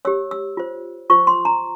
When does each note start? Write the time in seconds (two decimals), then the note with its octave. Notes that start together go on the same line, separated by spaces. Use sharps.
0.05 G4 C#5 E6
0.31 E6
0.57 F4 C5
1.10 F4 C5 C#6
1.27 C6
1.45 A#5